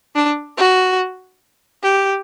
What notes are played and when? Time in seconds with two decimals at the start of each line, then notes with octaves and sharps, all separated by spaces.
0.15 D4
0.58 F#4
1.83 G4